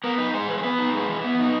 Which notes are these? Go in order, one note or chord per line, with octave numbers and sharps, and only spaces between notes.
B3 A#4
D#4 B4
G#3 C5
E3 B4
C5
B3 B4
D#4
G#3
E3
B3
D#4